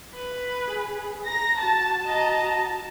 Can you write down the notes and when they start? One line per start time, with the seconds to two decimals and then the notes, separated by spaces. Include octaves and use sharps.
0.15 B4
0.68 G#4
1.27 A#5 A#6
1.63 F#4 A5 A6
2.05 D#5 A#5